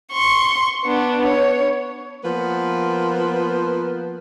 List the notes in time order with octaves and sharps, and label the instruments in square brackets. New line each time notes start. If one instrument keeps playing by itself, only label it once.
[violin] C6 C#6
B3 D4
C#5
[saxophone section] F3 A#3 B3